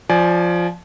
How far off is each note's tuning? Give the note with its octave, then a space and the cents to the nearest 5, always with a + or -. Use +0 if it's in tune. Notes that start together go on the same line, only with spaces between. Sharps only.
F3 +0 D5 +0 G#5 +25